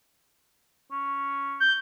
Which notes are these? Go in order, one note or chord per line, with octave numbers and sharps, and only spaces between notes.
C#4
G6